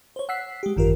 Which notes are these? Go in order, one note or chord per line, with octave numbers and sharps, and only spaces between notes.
C5 C#5
F#5 E6 F#6 B6 C7
G#3 G4
G#1 F#2 D#3 F4 G4 A#4